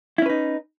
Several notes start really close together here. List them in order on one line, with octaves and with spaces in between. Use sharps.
E4 C#4 B4 D#4